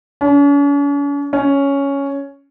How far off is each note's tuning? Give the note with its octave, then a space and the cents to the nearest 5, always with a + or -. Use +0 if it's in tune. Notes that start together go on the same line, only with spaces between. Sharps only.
C#4 +45
C#4 +5